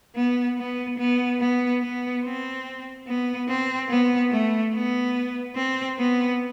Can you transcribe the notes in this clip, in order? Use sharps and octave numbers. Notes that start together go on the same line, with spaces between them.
B3
B3
B3
B3
B3
C4
B3
C4
B3
A3
B3
C4
B3